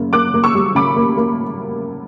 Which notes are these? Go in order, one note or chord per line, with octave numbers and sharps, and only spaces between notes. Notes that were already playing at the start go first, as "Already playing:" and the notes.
Already playing: F#2 C#3 A#3
A#3 D6 F#6
A#3
C#6 E6
G3
C#3 B5 D6
A#3
A#3